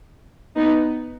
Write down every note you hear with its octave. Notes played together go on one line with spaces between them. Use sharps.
B3 D#4